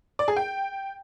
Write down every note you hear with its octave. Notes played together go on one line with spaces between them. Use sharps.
D5
G#4
G5